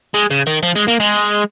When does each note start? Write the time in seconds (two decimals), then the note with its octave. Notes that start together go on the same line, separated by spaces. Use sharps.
0.14 G#3
0.31 C#3
0.47 D#3
0.63 F3
0.76 G#3
0.88 A#3
1.00 G#3